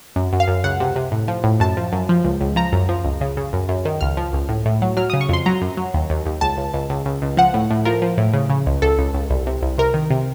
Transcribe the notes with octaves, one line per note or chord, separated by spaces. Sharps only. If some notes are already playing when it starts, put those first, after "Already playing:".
F#2
F#2
F5
F#2
C#2 F#5
C3
C3
A2
F3
A2
F#2 A5
F3
F#2
F3
C#2
C#2
F3 A#5
F#2
F3
C#2
C#3
C#3
F#2
F#2
D#3
C#2 F6
F3
C#2
A2
A2
F#3
F#3 F6
C#3 D#6
C#6
F2 C6
F#3 A#5
F#2
F#3
D#2
D#2
D#2
C#2 A5
C#2
C#2
C#2
C#2
C#2
F3 F#5
A2
A2
F3 A#4
F3
A2
C#3
C#3
C#2
C#2 A4
C#2
C#2
C2
C3
C2
C3 A#4
D#3
C3